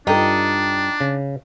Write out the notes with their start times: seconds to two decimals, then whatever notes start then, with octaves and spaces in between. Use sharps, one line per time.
0.07 G2 D4 D#4 F4 A4 G5
1.01 C#3